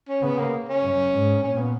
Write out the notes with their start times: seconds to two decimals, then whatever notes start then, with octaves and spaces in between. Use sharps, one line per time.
0.08 C#4
0.22 C#3 B3
0.38 A#3
0.68 C#4
0.83 F#2
1.13 G#2
1.42 A#2 C#4
1.58 B3